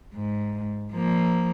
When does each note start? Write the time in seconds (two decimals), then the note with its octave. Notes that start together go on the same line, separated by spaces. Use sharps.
0.15 G#2
0.93 F3 A#3